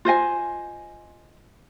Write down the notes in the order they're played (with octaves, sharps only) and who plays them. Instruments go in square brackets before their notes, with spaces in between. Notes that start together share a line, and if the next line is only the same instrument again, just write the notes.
[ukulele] F4 C5 D#5 G#5